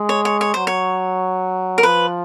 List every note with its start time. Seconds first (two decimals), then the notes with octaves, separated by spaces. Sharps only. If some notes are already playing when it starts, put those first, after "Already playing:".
Already playing: G#3
0.09 C#5
0.25 C#5
0.41 C#5
0.54 F#3 C5
0.67 C#5
1.78 A#4
1.83 F3 B4